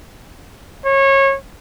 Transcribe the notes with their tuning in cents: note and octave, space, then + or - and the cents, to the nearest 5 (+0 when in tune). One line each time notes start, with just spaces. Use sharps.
C#5 -25